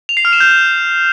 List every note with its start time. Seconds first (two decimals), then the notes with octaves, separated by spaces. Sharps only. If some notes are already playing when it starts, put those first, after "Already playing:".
0.09 F7
0.17 C7
0.25 F6
0.33 E7
0.40 G6